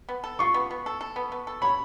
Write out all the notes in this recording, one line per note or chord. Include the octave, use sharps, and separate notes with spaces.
B3
A4
F4 C#6
B3
B3
A4
A4
B3
B3
A4
C#5 B5